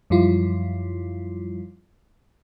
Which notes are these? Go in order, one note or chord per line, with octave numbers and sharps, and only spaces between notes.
F#2 F3 G3 E4 F4